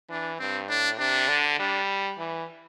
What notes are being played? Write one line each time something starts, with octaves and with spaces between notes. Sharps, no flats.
E3 D4
G2 C4
A2 D4
C3 D4
D3
G3 D4
E3